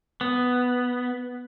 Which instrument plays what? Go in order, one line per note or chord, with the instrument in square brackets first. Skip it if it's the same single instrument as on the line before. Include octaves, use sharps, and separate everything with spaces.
[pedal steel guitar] B3